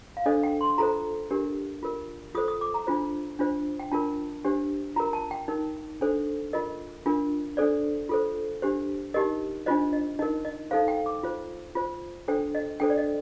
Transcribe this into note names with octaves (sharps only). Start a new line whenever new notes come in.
F5
D4 A4 C5 D#5
G5
C6
F4 A4 C5 A#5
D4 G4 A#4
F4 A#4
F4 A4 C5 D#6
D#6
D6
A#5
D4 F4 C5
D4 F4 C5
G5
D4 F4 A#4 A5
D4 G4 C5
F4 A#4 A#5
A5
G5
D#4 A#4
D4 A4 C5
F4 A#4 D#5
D4 F4 A#4
D4 A4 C5 D5
F4 A4 C5
D4 G4 C5
D#4 G4 A#4 D#5
D4 F4 C5 D#5
D#5
D#4 A#4 D#5
D#5
D#4 A4 C5 F5
G5
D6
F4 C5
F4 C5
D4 A4 C5 G5
D#5
D4 A4 C5 G5
D5
D#5